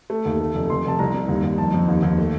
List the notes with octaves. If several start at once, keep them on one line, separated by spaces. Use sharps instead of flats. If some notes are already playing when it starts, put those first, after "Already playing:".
A3
D#2
A3
F1
F1 C6
F1 A5
C2 A#5
C2
D#2
D#2
F2 A5
F2
D#2
D#2
A3